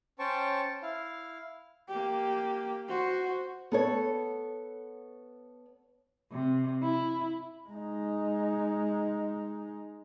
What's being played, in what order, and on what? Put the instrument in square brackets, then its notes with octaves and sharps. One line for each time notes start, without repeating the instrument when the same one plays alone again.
[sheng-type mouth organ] C#4 C5 G5 A5 C#6
E4 F5
[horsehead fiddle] A#3 G4
F#4 C5
[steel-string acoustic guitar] B3 A4 C#5
[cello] C3
E4
[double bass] G#3 D#4